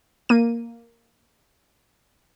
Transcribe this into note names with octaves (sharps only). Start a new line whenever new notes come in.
A#3 D#7